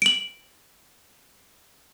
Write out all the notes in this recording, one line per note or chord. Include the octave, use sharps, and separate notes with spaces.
D7 F#7